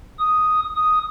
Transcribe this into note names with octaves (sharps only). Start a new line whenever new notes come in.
D#6
D#6